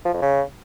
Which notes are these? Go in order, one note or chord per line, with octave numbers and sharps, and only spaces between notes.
F3
F2
C#3